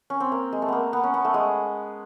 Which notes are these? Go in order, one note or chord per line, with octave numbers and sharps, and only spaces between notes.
C#4
C4
A#3
G#3
A3
A#3 B3
B3
C#4
B3
A3
G#3